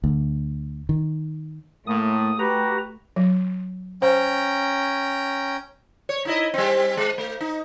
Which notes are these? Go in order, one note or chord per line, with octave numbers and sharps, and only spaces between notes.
D2
D#3
A2 A3 A#3 D#6
F#4 G4 B4 A#5
F#3
C#4 C5 G5 A#5
C#5
D#4 E4 D#5
G3 C4
G#3
A3
D#4